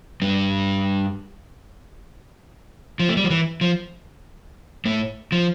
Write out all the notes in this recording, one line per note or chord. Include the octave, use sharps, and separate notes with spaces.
G2 G3
F3
A3
G3
F3
E3
F3
A2 A3
F3